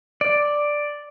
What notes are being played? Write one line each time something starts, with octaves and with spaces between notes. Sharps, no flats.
D5